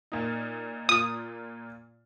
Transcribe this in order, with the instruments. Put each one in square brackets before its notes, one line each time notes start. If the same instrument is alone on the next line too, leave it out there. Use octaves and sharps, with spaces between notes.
[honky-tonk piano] A#2 A#3 D#4
[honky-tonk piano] A#2 A#3 F4 [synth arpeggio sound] D#6